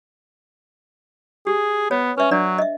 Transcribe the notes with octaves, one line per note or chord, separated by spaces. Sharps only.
G4 G#4
B3 C#5
C#4 B4 E5
F#3 D4 D5
D#5 E5